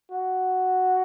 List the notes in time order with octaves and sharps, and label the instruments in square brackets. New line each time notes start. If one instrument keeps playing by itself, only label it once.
[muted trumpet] F#4